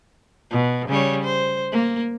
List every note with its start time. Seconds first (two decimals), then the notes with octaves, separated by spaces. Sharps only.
0.51 B2
0.88 C#3 G3 C#5
1.24 C5
1.72 A#3